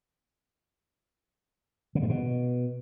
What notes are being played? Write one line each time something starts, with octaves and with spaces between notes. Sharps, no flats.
C#3
G2
B2